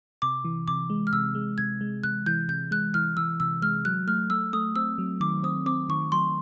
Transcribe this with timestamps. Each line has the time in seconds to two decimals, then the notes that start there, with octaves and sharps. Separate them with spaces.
0.22 C3 D6
0.45 E3
0.68 C3 D6
0.90 G#3
1.07 F6
1.13 C3 E6
1.35 G#3
1.58 C3 G#6
1.81 G#3
2.03 C3 F#6
2.26 E3 G6
2.49 C3 G6
2.71 G#3 F#6
2.94 E3 F6
3.17 E3 E6
3.40 C3 E6
3.62 G#3 F6
3.85 F#3 F#6
4.07 A3 F6
4.30 A3 E6
4.53 A3 D#6
4.76 C4 E6
4.98 F#3
5.20 D#3 D6
5.43 C4 D#6
5.66 C4 D6
5.89 D#3 C#6
6.12 F#3 C6